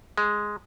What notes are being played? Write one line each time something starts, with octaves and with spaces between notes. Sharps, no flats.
G#3